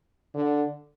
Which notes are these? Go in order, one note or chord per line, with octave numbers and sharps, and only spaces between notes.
D3